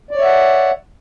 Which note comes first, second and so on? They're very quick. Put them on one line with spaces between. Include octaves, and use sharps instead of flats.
D5 C#5 E5 F#5